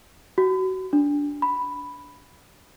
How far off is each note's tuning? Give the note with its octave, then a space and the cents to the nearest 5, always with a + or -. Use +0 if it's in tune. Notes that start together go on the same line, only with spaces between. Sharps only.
F#4 +25
D4 -15
B5 +0